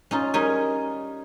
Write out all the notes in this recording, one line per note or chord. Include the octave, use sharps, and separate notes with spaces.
C#4 D#4 F4
G3 D#4 A#4 C#5 G#5